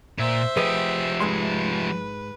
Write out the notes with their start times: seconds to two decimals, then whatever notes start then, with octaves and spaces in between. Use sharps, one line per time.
0.19 A#2 C5 E5
0.57 F3 G4 G#4 B4 D#5
1.20 G#2 G#3 B4 C6